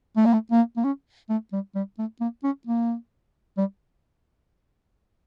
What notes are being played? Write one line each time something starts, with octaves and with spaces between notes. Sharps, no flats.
A3
A#3
A3
A#3
A#3
C#4
A3
G3
G3
A3
A#3
C#4
A#3
G3